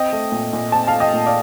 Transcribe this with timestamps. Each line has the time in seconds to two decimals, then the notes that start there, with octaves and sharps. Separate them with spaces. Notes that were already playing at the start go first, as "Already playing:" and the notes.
Already playing: C4 D#5 G5
0.13 A3
0.32 A#2
0.53 A#2
0.72 C4 A5
0.87 F5 A5
0.94 A3
1.00 D#5 G5
1.14 A#2
1.26 D5 F5